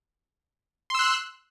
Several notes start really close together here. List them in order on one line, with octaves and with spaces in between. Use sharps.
C6 E6 F#6